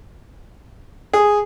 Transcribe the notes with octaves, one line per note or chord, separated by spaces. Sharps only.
G#4